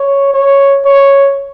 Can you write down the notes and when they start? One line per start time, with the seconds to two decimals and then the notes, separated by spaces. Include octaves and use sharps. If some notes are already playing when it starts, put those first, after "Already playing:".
Already playing: C#5
0.34 C#5
0.85 C#5